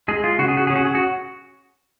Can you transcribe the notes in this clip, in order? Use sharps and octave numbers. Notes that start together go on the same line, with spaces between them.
G#3 G#4
F4
C#3 F#4
G#4
F#4
G#4
C#4
F#4
G#4
F#4